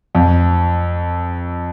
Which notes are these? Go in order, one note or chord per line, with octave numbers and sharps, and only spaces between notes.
F2